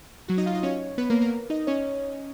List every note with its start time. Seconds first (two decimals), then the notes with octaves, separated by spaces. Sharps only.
0.28 F#3 F#4
0.38 D#4 D#5
0.46 F4 F5
0.55 D#4 D#5
0.63 C#4 C#5
0.98 B3 B4
1.10 A#3 A#4
1.21 A#3 A#4
1.50 D#4 D#5
1.67 C#4 C#5